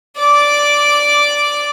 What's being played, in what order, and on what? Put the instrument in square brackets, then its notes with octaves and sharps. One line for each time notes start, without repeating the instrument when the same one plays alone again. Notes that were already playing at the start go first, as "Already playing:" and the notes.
[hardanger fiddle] D5 D6